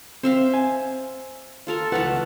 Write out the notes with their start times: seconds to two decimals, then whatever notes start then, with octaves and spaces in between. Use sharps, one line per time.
0.23 C4 C5 E5 F5
0.54 G#5
1.67 F4 A4 A#4
1.92 C#2 E3 A3 B4 F#5 A5